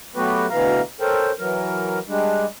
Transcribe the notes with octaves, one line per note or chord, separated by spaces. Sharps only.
F#3 A3 B3 F#4 G4 B4
D2 B2 E3 F5 A#5
C#4 A4 A#4 C5 G5
E3 F#3 A#4
G3 G#3 D4